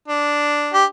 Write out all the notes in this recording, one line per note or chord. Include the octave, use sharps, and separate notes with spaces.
D4
G4